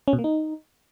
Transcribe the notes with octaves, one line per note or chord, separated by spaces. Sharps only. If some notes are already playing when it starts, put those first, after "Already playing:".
C#4
B2
A#3
D#4